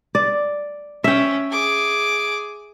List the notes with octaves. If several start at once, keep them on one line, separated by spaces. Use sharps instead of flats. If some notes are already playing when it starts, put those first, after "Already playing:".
D5
C#4 E5 G5
G#4 D6